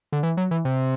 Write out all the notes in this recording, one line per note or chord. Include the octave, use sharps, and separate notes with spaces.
D3
E3
F#3
E3
C3